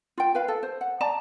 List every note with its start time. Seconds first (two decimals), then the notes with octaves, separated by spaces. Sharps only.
0.18 F4 G5
0.35 B4 F5
0.48 A4
0.63 C5
0.81 F#5
1.01 D5 A5 A#5